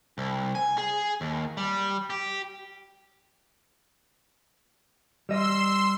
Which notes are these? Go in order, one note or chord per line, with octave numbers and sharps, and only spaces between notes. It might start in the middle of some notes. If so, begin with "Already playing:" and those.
C2
G#5
G#4
D#2
G3
G4
G3 D#5 C6 E6